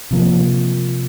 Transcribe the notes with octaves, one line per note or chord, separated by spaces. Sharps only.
C3 F3 A#3